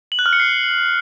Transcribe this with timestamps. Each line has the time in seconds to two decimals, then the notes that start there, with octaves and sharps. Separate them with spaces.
0.12 F#7
0.19 F#6
0.26 F6
0.33 C#7
0.40 C7